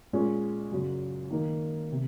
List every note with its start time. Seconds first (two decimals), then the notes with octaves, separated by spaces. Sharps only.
0.13 A#2 G#3 C#4
0.72 F#2 C#3 F#3
1.31 D#3 A#3 D#4
1.92 C3